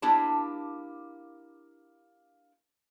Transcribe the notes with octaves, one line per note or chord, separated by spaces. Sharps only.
A#3 D4 E4 G4 A5